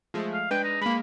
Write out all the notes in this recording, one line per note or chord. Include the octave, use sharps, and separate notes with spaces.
F3 G#3 A3
F5
G#3 D4 B4 G5
D#4
G#3 A#3 B5